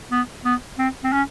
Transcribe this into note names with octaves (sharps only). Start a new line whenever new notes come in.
B3
B3
C4
C4
C#4